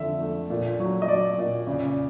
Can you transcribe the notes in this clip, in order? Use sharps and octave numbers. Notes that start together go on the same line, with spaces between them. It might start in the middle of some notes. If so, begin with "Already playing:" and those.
Already playing: F2 D3 F3 E5
A3
A#2
F#3
D#5
F#3 D5
A#2
C#3